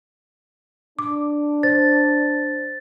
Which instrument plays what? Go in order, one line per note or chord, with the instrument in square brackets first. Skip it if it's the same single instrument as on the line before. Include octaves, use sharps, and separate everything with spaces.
[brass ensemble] D4 [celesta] D6
[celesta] C5 [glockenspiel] A6